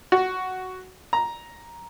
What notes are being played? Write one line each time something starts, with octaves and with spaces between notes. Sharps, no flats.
F#4
A#5